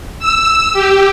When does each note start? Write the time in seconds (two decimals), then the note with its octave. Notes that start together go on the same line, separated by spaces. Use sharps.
0.19 E6
0.73 G4